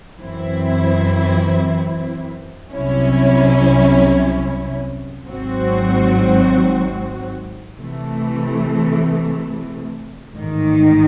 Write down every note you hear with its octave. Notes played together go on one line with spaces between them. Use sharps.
F#2 E3 C4 E4
C2 C3 F#3 C#4 E4
G#1 G#2 F#3 C4 F#4
C3 E3 A3
A1 G#2 D#3